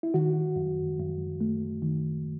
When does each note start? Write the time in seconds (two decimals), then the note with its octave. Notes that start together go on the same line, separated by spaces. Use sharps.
0.03 E4
0.14 D#3 F#4
0.56 F#2
0.99 F#2
1.41 A3
1.82 D#3